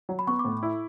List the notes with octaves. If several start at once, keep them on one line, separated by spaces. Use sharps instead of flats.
F#3
B5
B3 C#6
D6
A2
E4